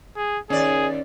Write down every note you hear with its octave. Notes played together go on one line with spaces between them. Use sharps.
G#4
D#2 C#4 G#4 D5